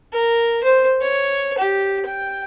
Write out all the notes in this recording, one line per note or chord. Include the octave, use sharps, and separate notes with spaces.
A#4
C5
C#5
G4
G5